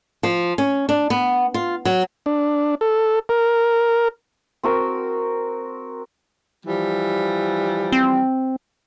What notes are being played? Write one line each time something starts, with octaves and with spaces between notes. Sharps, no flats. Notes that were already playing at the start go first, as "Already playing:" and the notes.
F3
C#4
D4
B3
F4
F#3
D4
A4
A#4
C4 F#4 A#4
E3 F3 G3
C4